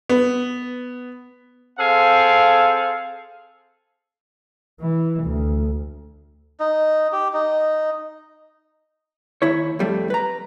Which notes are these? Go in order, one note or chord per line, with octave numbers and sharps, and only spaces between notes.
B3
C4 G#4 A4 F5
E3
D2
D#4
G4
D#4
D#2 E4 C#5
F2 G3 A3
B4 A#5